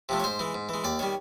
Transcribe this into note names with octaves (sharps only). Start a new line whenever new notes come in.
C3 F3 A3
C#5
G#2 C5
E3 G#3
G#2
E3 G#3
D#2 D5
D#3 G3 C#5